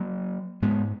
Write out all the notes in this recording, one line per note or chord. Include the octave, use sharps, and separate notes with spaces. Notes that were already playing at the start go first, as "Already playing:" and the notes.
Already playing: F#3 A#3
G#2 G#3 B3